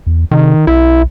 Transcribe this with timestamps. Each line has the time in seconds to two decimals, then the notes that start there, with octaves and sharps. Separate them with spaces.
0.07 E2
0.31 C3 D#3
0.67 B1 E4